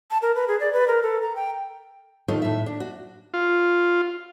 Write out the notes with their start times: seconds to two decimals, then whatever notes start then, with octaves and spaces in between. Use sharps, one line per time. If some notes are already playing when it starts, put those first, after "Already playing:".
0.11 A5
0.22 A#4
0.35 B4
0.48 G#4
0.60 D5
0.73 B4
0.88 A#4
1.02 A4
1.22 A#5
1.36 G5
2.28 A2 D#3 A3 D#4 F4
2.42 A2 E5
2.66 D4
2.80 F#4
3.34 F4